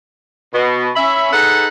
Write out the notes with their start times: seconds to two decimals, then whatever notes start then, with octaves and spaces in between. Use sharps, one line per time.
0.53 B2
0.96 C#4 E5 B5
1.33 D#4 G#4 A4 B4 F#5